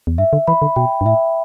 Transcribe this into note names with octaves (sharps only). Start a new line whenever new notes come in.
E2
G2 E5
D3
E3 B5
D3
B2 G5
G2
A2 E5